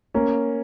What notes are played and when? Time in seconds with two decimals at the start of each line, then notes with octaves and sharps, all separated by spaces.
0.14 A#3 C#4